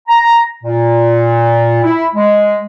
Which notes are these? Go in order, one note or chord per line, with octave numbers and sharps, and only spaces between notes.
A#5
A#2
E4
G#3